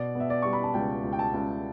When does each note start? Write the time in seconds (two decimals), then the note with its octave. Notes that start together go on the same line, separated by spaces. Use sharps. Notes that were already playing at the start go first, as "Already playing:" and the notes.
Already playing: B2 D5
0.15 B3 E5
0.30 D5
0.42 G3 C#6
0.53 B5
0.64 A5
0.74 C#2 G5
1.04 C#2
1.13 G5
1.19 A5
1.34 C#2